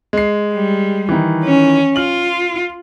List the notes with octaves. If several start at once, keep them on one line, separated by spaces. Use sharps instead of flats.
G#3 C7
G3
D#3 E3
C#4
F4 F6 F#7